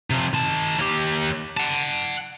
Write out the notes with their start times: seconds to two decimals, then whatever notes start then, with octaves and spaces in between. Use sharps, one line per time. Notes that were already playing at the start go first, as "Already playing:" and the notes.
0.10 C3 F3
0.33 D#3 A5
0.78 D#2 G4
1.57 F#5 A5